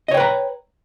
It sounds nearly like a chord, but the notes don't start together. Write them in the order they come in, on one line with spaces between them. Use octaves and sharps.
D#5 C#5 G5 B4 A#5